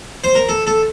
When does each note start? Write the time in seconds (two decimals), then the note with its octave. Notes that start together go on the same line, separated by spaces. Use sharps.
0.24 C5
0.35 A#4
0.49 A4
0.67 A4